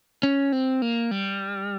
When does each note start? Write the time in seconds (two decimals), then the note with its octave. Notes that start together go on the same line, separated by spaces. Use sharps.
0.23 C#4
0.52 C4
0.82 A#3
1.11 G3